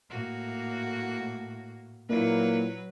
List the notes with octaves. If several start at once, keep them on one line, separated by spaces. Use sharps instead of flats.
A2 A#3 F#4
A#2 F#3 A#3 E4 B4